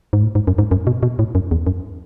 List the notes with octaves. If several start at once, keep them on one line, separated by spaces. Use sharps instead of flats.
G#2
A2
G#2
F#2
G#2
F#2
B2
B2
A2
F#2
E2
F#2